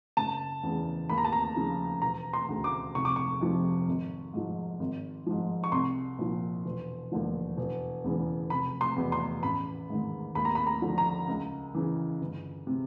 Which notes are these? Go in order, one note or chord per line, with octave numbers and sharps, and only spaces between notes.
F#1 A5
E2 C#3 E3
D#2 B5
A#5
A5
A#5
C#3 F3
E1 A#5
C6
D2 C#3
D6
F1 C#6
D6
C#6
F2 C3 F3
G#1
G#2 F3
G#1
G#2 F3
C#6
C2 C6
A#2 F3
E1
D#2 D3 F3
E1
E2 C#3 E3
F1 B5
C6
E2 B2
C6
A1 B5
G#2 D#3
D#2 B5
A#5
B5
A#5
D3 F3
A#5
C#2
C#3 E3
G1
C3